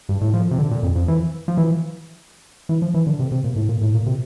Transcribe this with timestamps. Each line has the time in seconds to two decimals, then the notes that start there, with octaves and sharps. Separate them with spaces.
0.09 G2
0.21 A2
0.34 F3
0.51 C3
0.58 D3
0.71 A#2
0.83 F2
0.96 F2
1.08 E3
1.48 F3
1.57 E3
2.69 E3
2.82 F3
2.94 E3
3.07 D3
3.19 C3
3.32 C3
3.44 A#2
3.56 A2
3.69 A#2
3.81 A2
3.94 A#2
4.06 C3